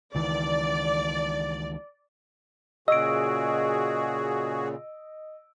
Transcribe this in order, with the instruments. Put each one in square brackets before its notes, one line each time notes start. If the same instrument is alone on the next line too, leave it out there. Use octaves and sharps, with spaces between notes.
[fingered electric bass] C#2 D#3 E3 [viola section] D5
[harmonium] A#2 C#3 [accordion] F#4 G#4 [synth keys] D#5 [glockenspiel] E6 D7